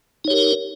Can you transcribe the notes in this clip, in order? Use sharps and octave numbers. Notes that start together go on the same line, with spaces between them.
D#4 G4 A#4 C#5